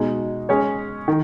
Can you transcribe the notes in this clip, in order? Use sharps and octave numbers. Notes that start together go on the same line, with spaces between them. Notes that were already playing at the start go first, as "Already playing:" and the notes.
Already playing: B2 G#3 D#4
G#3 C#4 G#4 C#5
D#3